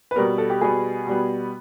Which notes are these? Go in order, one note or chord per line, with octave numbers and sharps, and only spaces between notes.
B4
B2 G3 B3 A#4
A4
G4
B2 G3 B3 G#4
B2 G3 B3